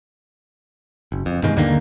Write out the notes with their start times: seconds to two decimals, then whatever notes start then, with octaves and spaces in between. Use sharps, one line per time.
1.12 F#1
1.26 F2
1.43 G2 B2 D#3 G#3
1.56 D#2 D3 D#3 A#3